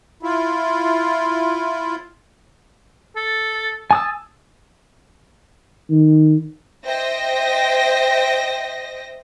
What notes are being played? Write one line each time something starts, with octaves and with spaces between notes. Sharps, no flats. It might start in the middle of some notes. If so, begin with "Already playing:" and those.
E4 F4
A4
G#5 A5 D#6 E6
D#3
C5 D#5 E5 G5 A#6